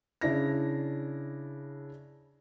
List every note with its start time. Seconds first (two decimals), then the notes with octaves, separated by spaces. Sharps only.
0.21 C#3 D4 E4 A#6